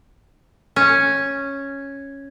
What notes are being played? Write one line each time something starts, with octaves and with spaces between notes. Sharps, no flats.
C#4